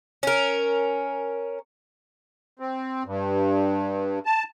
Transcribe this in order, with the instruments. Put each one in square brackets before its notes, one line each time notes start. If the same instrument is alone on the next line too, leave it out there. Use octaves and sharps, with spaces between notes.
[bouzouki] C#4 A#4
[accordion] C4
G2
A5